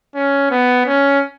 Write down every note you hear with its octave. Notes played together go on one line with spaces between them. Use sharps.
C#4
B3
C#4